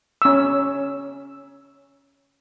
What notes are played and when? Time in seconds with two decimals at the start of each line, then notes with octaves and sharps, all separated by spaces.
0.22 C#4 E6